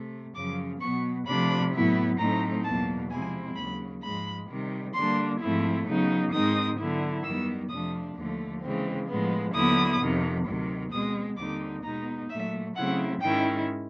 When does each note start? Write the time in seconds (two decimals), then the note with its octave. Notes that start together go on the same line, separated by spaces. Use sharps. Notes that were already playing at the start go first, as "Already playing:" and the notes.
Already playing: C3 A3
0.35 F#2 C#3 F3 D6
0.80 B2 F#3 B3 C#6
1.26 C3 F3 A3 D4 B5
1.72 A2 F#3 B3 E4
2.18 A2 F#3 A3 C4 D#4 A#5
2.64 E2 B2 F#3 A#3 A5
3.10 C3 F3 G#3 C4 E4 G#5
3.56 D#2 C#3 F#3 B5
4.02 G#2 F3 G#3 B5
4.49 C3 D#3 G3
4.94 D3 G3 A#3 D4 C6
5.40 G#2 F3 A3 C4 E4
5.87 C#3 F#3 B3 D#4
6.32 G#2 D#3 G#3 C4 D#4 D#6
6.78 D3 F#3 B3 E4
7.24 F#2 D#3 G3 B3 E6
7.69 F2 C3 F3 A3 D4 D#6
8.16 D#2 D3 F3 A3
8.62 C#3 E3 G#3 C4
9.08 A2 F3 G#3 B3
9.54 D#2 D3 F#3 B3 E4 D#6
10.00 F2 C3 D#3
10.45 D2 C3 D#3 F#3
10.92 B2 G#3 C4 D#6
11.37 D#2 D3 G3 C4 D#4 D6
11.83 B2 G#3 B3 D#4 A#5
12.30 A#2 F#3 A3 E5
12.75 C#3 F#3 A3 C4 E4 F#5
13.21 G#2 D#3 G#3 C#4 E4 G5